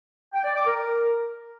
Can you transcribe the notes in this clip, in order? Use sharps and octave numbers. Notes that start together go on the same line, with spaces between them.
G5
D5
D6
A#4